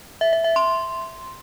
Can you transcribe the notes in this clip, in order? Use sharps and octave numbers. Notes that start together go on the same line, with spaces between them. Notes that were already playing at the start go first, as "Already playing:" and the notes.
E5
E5
E5
C6